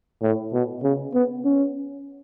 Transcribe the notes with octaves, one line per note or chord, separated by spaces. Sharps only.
A2
B2
C#3
B3
C#4